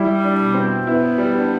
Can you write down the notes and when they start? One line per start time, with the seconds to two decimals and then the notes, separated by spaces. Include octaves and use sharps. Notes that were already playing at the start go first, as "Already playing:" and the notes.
Already playing: G3 E4
0.24 D4
0.40 B2
0.55 C4
0.87 B3 E4
1.18 G3
1.34 D4